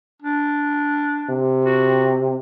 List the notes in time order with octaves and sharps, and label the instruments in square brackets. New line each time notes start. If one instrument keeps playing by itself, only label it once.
[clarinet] D4
[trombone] C3
[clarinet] F#4